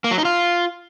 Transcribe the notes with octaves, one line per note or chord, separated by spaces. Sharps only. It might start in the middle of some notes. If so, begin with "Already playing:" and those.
A#3
F#3
D#4
F4